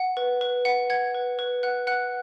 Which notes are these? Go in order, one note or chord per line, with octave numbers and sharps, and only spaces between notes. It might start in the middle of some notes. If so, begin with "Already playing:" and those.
Already playing: F#5
B4
B4
F#5
F#5 G#6
B4
B4
F#5 F#6
F#5 F#6